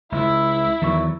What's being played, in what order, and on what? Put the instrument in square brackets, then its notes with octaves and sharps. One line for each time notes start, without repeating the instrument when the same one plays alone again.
[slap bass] C#2 [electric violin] E4 [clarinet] E5
[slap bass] E2 F#3 [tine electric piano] D#3 C#6